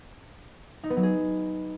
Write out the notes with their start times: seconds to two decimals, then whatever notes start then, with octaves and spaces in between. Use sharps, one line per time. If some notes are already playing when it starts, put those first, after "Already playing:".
0.84 D#4
0.90 B3
0.97 F#3
1.03 G#4